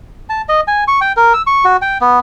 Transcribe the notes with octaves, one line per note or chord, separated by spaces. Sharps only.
A5
D#5
G#5
C#6
G5
A#4
E6
C#6
F#4
G5
B3